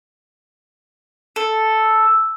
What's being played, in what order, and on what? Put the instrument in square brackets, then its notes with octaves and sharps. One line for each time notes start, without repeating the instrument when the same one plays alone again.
[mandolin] A4